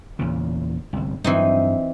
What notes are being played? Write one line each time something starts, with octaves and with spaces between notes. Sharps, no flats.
E2 A#2 C#3
G1 C2
G2 E3 F#3 C4 D#4